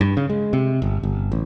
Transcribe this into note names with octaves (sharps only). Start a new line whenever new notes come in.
G2
C#3
G#3
C3
G1
G1
A1